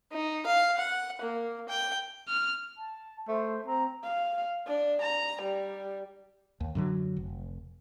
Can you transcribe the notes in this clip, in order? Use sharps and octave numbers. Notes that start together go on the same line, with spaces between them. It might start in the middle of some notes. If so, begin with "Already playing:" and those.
D#4
F5
F#5
A#3
G5
F6
A5
A3 C5
C4 A#5
F5
D4
A#5
G3
D#2
F#2 D3 F#3
F1